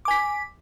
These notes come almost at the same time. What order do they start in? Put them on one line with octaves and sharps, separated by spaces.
D6 G#5 B6